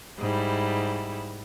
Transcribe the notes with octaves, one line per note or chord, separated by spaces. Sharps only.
G#2 G3 E4